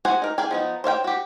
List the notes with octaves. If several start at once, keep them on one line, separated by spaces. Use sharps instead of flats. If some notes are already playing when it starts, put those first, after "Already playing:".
F#4 G#4 C5 F#5 G#5
D#4 A#4
G#4 F5 G5 G#5
F3 B3 D#4
C5 C#5 F5 G5
F#4 G4